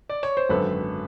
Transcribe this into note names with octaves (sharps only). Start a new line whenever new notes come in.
D5
C#5
C5
G#1 F#2 D3 F#3 A4 B4